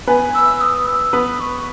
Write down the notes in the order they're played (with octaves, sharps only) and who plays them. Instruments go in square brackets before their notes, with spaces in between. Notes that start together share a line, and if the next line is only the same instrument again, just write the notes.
[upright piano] B3 B4 [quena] G#5
[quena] E6
D#6
E6
[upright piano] B3 B4 [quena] D#6
[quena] C#6